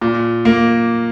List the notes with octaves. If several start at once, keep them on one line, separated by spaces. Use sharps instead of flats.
A#2
A#3